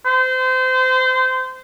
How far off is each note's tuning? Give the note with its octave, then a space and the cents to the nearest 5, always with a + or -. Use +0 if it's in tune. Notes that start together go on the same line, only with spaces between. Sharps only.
C5 -25